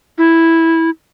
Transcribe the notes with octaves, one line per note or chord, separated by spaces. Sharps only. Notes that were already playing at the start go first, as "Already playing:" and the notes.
E4